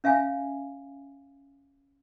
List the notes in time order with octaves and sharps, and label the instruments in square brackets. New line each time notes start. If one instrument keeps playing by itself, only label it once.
[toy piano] C#4 E5 F5 G#5